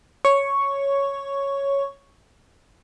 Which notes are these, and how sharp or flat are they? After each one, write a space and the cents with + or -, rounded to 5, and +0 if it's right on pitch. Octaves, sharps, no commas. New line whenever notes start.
C#5 +0 C#6 +0